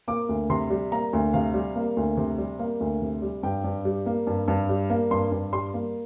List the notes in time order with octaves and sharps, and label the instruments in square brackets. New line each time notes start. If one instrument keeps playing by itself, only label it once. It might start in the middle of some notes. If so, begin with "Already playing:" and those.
[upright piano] A#3 D6
D2
C3 C6
G3
A#3 A#5
D2
C3 F5
G3
A#3
D2
C3
G3
A#3
D2
C3
G3
G2 G5
G2
G3
A#3
G2
G2
G3
A#3
G2 C6
G2
G3 C6
A#3